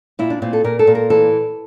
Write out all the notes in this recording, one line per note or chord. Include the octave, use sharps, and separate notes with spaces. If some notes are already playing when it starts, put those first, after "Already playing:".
A#2 E4
D4
A#2 C4
A4
A#2 A#4
A4
A#2
A#4
E3 A4